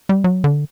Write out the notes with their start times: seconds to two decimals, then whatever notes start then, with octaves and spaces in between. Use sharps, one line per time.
0.09 G3
0.24 F#3
0.44 D3